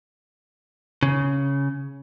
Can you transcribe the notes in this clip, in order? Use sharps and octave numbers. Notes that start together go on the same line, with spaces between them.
C#3